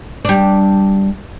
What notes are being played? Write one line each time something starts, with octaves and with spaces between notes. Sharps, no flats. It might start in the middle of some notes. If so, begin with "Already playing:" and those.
G3 D4